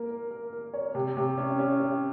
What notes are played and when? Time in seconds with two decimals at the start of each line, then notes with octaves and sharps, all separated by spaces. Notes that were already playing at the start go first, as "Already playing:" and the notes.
Already playing: A#3 A#4
0.10 A#4
0.31 A#4
0.53 A#4
0.74 C#5
0.95 C3
1.17 C3
1.38 C#4
1.59 C#4
1.80 C#4